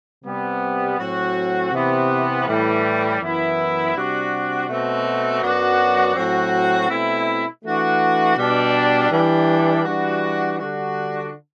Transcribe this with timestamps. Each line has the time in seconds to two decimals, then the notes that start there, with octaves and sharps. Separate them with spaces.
0.25 C3 G3 B3
0.98 A2 F#3 C4 F#4
1.72 C3 E3 B3
2.46 A2 E3 G3
3.20 F#2 E3 B3 E4
3.94 C3 G3 D4 F#4
4.68 B2 A3 C4 F#4
5.41 F#2 F#3 B3 D4 F#4
6.16 A2 F#3 C4 F#4
6.89 B2 A3 C4 E4
7.62 E3 A3 D4 F#4
8.37 B2 G3 D4
9.11 E3 G3 D4
9.84 E3 G3 D4 F#4
10.58 D3 G3 D4 F#4